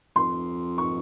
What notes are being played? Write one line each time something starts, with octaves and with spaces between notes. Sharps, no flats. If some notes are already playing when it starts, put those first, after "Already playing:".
F2 C6
C#6